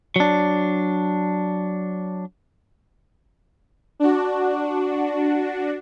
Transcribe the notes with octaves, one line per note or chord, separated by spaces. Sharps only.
F#3 D4
D4 F#4